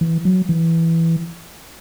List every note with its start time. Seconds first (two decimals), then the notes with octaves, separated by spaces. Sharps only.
0.01 E3
0.25 F#3
0.49 E3